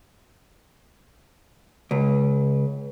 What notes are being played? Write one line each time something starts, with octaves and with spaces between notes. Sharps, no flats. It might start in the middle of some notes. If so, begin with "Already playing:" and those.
C#2